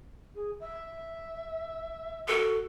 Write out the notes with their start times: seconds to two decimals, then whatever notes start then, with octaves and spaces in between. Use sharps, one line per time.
0.34 G#4
0.59 E5
2.28 F#4 A4